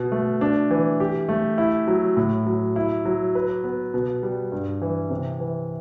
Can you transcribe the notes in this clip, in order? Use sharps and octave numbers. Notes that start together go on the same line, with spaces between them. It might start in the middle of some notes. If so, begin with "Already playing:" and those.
Already playing: B2 B3
A3
D4
E3
G4
A3
E4
F#3
A2
F#3
E4
F#3
B4
B3
B2
G3
G2
E3
C3
E3